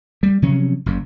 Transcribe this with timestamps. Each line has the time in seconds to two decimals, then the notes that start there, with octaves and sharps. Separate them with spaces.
0.23 G3
0.42 C3 F3 F#3 C#4
0.86 F#1 F#2